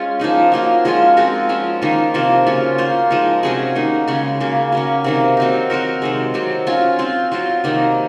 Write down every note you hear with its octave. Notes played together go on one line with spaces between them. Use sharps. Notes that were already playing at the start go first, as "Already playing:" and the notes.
Already playing: G#3 C#4 F4 C5
F3 A#3 D#4 G#4
F#3 A#3 F4
F3 G#3 C#4 F4
G#3 C4 F#4 A#4
F3 G#3 C#4
D#3 A#3 F4
C3 F3 A#3 F4
C#3 F#3 C#4 F4
A#3 F4 C5
F3 G#3 D#4 A#4
C3 F#3 C#4 G#4
D#3 A#3 D#4
C#3 G#3 C#4
C#3 F#3 A#3
F#3 A#3 C#4
C3 D#3 F#3 A#3
F#3 C4 D#4
F#3 C4 F#4 A#4
C3 D#3 G#3
C3 F#3 C4
F#3 C#4 F4
C4 F4 C5
F#3 C4 F4 C5
C3 D#3 A#3